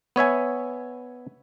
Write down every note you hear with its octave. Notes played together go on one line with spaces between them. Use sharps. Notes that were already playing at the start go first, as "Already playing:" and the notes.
B3 C#5 E5 G#5